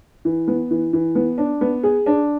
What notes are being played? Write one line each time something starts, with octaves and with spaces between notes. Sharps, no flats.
E3
B3
E3
E3
B3
D4
B3
G#4
D4